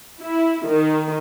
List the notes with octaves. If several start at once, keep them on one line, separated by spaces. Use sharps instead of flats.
E4
D#3